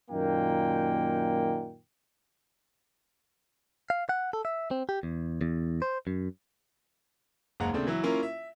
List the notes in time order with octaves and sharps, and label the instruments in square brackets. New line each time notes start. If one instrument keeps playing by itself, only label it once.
[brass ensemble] F#2 A#2 D#3 A#3 G5
[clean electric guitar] F5
F#5
A4
E5
C4
G4
E2
E2
C5
F#2
[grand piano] F#1 D#2 G#3 F#5 A#5
A#2 C#3 A3 C4 D4
E3 F#3 E4
A#3 C#4 E4 F4 A#4
E5